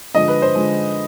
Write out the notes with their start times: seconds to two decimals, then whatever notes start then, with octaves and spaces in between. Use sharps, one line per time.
0.15 D3 F3 G#3 D#5
0.28 B4
0.42 C5
0.55 D3 F3 G#3